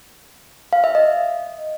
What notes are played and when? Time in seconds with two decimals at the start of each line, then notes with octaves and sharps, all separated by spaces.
0.73 F5
0.84 E5
0.95 D#5